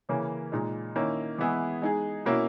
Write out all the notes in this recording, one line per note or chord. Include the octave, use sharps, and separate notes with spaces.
C#3 E3 A#3 C#4
A#2 G#3 D#4
D#3 A#3 C#4 E4
E3 G#3 B3 E4 G#4
G#3 D#4 G#4
B2 A#3 C#4 E4